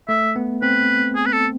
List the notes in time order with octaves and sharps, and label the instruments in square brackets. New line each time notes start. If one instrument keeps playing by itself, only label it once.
[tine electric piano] A3 [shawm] E5
[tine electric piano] B3
[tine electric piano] C4 [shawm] B4
[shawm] G#4
B4
A4